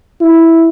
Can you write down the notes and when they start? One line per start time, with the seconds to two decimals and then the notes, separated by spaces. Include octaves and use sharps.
0.21 E4